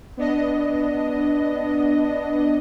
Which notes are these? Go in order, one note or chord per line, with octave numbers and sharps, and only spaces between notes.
B3 D4 D#5